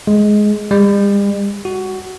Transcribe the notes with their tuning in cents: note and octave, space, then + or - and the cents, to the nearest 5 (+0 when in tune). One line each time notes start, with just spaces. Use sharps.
G#3 +10
G3 +45
F#4 +15